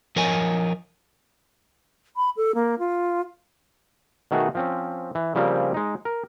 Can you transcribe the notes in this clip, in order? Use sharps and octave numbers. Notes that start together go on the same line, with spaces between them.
F3 A#4 C#5 D#5 G#5
B5
A4
A#3
F4
B2 D#3 A3 F#4 G#4
F3 C4 C#4
E3
C#3 F3 G3 A#3 C4 G4
G#3 D#4
A#4